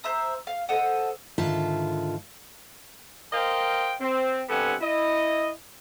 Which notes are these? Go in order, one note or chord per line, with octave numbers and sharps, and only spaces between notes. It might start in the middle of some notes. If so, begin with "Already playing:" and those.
C5 E5 A#5 D#6
F5
A4 C5 D#5 F#5
G#2 D3 D#3 F4 E5 A5
A#4 C5 D#5 F5 G5
C4
G2 C3 B3 A4 F#5 G#5
E4 D#5